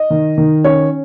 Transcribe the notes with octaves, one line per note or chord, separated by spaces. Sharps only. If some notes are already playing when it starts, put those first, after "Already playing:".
Already playing: D#5
D#3
D#3
C#4 C#5